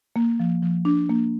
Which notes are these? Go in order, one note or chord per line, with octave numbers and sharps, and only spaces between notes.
A#3
F3
F3
D4
A#3